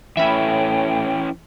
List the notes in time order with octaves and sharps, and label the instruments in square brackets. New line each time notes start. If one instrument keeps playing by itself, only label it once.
[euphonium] A2 [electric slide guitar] E3 C#4 [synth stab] E5 B5 [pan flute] G5